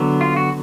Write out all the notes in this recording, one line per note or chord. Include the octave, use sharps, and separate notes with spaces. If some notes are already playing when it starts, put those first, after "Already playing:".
Already playing: D3 F#3 B3
F4
F#4